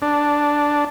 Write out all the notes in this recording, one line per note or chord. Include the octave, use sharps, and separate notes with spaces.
D4